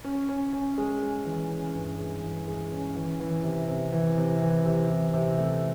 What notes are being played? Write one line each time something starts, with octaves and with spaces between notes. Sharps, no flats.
C#4
C#4
C#4
G#3
G#3
E3
C#4
G2
G#3
E3
G#3
C#4
E3
E3
C3
C3
E3
C3
E3
C3
E3
C3
A3